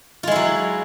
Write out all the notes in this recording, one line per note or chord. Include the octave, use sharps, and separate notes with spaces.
F#3 G#3 E4 F4